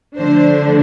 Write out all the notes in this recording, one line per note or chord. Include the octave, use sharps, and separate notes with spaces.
D3 F3 A3 D4 C5